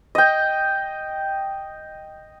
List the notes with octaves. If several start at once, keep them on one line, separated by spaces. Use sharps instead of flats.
D#5 G5